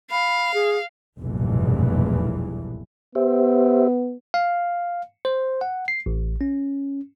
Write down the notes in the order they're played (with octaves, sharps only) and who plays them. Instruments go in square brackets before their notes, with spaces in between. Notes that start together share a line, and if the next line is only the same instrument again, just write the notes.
[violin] F5 [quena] B5
[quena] G#4
[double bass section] F1 B1 E2 G2 A#2 E3
[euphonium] B3 [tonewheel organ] G4 C5 E5
[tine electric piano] F5
C5
F#5
C7
A1
C#4